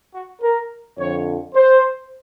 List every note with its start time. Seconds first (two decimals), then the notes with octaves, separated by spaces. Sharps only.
0.13 F#4
0.41 A#4
0.98 F2 D3 F3 C#5
1.54 C5